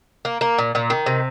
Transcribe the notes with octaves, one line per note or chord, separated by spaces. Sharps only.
A#3
A#3
A#2
A#2
D#3
C3